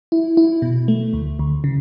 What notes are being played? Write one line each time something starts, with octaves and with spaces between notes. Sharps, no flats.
E4
E4
B2
A3
D2
D2
C#3